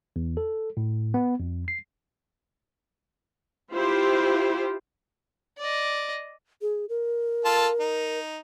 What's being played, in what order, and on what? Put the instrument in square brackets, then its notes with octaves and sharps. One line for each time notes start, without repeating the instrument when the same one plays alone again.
[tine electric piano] E2
A4
A2
B3
F2
C7
[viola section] E4 F4 G4 C5
[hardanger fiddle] D5 D#5
[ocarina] G#4
A#4
[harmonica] F4 A4 A5
D#4